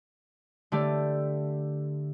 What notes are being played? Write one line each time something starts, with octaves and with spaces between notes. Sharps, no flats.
D3 A3 G4 D5